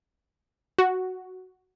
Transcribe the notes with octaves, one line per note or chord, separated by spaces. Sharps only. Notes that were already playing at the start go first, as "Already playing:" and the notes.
F#4